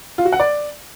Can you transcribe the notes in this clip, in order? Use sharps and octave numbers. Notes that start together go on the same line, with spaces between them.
F4
F#4
F#5
D5